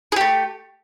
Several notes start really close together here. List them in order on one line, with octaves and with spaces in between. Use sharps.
G#4 G4 A3